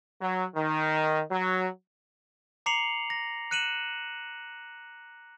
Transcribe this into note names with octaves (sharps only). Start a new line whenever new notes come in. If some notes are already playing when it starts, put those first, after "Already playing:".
F#3
D#3
F#3
A#5 D6 C7 C#7 F7 F#7
A#6
F#6 C#7 D#7 E7 F#7